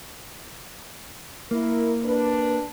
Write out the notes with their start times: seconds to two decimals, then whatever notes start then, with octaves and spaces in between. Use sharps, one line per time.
1.51 A#3 E4 A#4
2.04 D4 B4